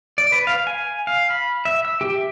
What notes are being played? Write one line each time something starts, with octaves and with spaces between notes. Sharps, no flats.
D5
B4
F5
G#5
F5
B5
E5
E6
G4
E5